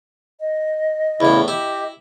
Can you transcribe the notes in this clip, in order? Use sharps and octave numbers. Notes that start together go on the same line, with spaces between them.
D#5
E2 A2 C#3 E4
E4 G4 D#5